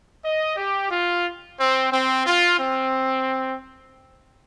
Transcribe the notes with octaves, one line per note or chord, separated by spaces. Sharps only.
D#5
G4
F4
C4
C4
F4
C4